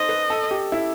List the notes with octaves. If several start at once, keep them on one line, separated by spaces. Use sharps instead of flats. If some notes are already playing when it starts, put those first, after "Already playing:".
Already playing: D#4 A4 C5 D#5
B4
A4
G4
E4